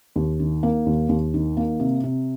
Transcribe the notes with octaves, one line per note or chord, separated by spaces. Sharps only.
D#2
D#3
A#3
D#2
D#2
D#3
A#3
C3
C3